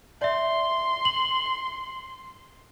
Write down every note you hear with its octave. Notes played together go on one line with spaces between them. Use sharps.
D5 E5 C6
F#7